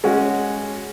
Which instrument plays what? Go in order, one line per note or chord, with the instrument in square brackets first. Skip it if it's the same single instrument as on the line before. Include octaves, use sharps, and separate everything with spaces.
[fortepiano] G#3 C#4 F#4